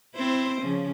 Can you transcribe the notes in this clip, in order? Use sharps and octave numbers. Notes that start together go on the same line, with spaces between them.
C4 E4 C5
C#3 F3 C#4